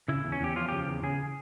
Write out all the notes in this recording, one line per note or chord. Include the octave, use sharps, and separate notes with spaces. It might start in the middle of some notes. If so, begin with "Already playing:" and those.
C#3 E4
E2
C#4
E2 G4
F3 F4
C#3 G4
E2
C#3 G#4